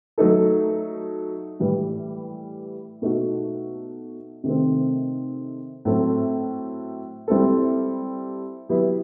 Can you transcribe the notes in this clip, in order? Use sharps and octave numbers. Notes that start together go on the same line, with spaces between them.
F#3 A3 D#4 A4
A2 E3 G3
B2 A3 D#4 F#4
C3 D#3 A3 C4
A2 F#3 C4 E4 A4
G3 C4 E4 A4
F#3 B3 E4 G4